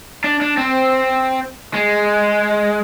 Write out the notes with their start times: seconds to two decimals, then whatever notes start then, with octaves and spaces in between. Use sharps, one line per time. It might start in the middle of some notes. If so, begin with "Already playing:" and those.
0.24 D4
0.41 D4
0.58 C4
1.74 G#3